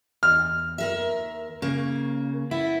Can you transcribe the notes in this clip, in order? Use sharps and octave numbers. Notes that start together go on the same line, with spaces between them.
E2 F6
D#2 A#4 E5
C#3 A#3
B3 E4